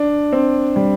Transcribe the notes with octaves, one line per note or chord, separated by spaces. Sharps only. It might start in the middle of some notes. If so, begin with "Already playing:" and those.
Already playing: D4
C4
G3